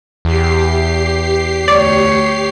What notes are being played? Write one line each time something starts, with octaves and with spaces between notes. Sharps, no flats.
E2 G4 C7
D2 C#5 D5